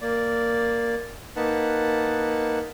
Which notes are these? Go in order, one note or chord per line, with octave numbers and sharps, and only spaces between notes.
A#3 D5
A#3 D#4 B4 F#5 A5